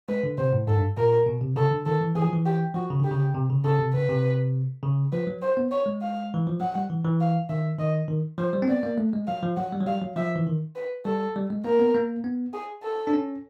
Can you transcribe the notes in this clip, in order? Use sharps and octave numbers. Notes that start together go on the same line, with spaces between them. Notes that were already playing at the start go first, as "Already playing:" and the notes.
G#3 B4
D3
C3 C5
A2
G#2 A4
G2
A#2 A#4
B2
C3
C#3 A4
D3
D#3 A4
E3
E3 G#4
F3
E3
G4
F3 F#4
C#3
D3 G4
C#3
C3
C#3
C#3 A4
C3
C#3 B4
C3
C#3
F3 B4
F#3
C5
B3
C#5
G#3
F5
E3
F3
F#3 F#5
G3
E3
E3
F5
D#3 E5
D#3 D#5
D#3
F3 C5
G3
C4
B3 D5
A#3
A3
G#3
F#3 F5
F3
F#3 F#5
G3
F#3
G3 F5
F#3
F3 E5
E3
D#3
B4
G3 A4
G3
G#3
A#3 A#4
B3
A#3
B3
G#4
A4
D4
C#4